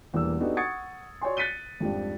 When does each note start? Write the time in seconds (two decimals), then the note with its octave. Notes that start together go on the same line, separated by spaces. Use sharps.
0.13 E1 E2 G3 A#3 G4 E6
0.40 B3 D4 D#4 F#4 G4 A4
0.57 F#5 C#6 D#6 G#6 A6 C#7
1.21 F#4 C#5 D5 G#5 C6
1.37 F#6 A6 B6 C#7 D#7 G7
1.80 F2 G#2 F3 G3 D4